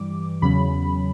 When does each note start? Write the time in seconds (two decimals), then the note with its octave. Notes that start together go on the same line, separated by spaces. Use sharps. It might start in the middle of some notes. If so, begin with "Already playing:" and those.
Already playing: G2 E3 G3 D6
0.42 E2 C#3 F#3 C#4 B5